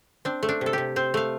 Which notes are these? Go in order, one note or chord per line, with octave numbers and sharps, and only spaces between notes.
C4 D4
A3
D4
C3
A4
C3 G4
C4 C5
A3 F5